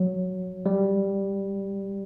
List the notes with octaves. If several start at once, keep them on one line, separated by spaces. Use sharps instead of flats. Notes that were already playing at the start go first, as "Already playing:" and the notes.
Already playing: F#3
G3